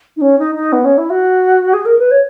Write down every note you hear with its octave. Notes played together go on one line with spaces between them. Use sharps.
D#4
C#4
D#4
D#4
B3
C#4
E4
F#4
G#4
A#4
B4
C#5